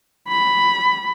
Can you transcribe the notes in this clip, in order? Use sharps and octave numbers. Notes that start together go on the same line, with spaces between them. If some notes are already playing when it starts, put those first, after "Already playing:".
B5